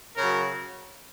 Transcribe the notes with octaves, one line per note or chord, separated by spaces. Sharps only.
C#3 F#3 A#4